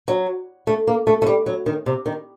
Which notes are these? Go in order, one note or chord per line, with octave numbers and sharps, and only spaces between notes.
F#3
A3
A#3
A3
A3
G3
F#3
D#3
C3
D#3